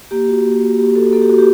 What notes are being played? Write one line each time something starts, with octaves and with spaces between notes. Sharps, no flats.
A#3 G4
F#4
A#3
F#4
A#3 G4
F#4 A4
A#3 A4
G4
F#4
G4